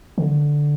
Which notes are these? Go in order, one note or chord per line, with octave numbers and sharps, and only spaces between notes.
D3